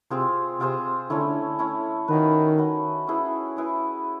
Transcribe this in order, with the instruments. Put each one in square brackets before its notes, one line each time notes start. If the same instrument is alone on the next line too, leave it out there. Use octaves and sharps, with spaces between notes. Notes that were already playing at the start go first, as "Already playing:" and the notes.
[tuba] C3 [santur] C4 F4 G#4 C5
[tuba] C3 [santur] C4 F4 G#4 C5
[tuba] D3 [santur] A3 C#4 E4
[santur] A3 C#4 E4
[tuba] D#3 [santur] C#4 F#4 B4
[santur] C#4 F#4 B4
C#4 E4 G#4 B4
C#4 E4 G#4 B4